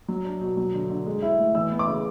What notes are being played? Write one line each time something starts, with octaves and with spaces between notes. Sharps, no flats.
F#3
D4
B2
F#3
D3
D3
G#3
E4
A2
E3 E6
B3
D6
C#3